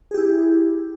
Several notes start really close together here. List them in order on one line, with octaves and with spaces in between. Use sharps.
G#4 G4 E4